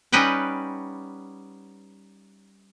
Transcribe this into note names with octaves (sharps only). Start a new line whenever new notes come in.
G3 C#4 D#4 B4 F#5 G5